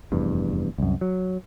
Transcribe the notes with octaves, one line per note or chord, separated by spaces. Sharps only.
F1 E2 G2
C2 F#2
F#3